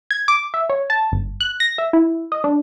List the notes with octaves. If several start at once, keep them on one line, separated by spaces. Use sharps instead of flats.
G#6
D6
E5
C#5
A5
G1
F#6
A#6
E5
E4
D#5
D4